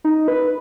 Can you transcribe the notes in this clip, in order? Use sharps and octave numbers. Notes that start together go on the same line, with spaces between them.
D#4
B4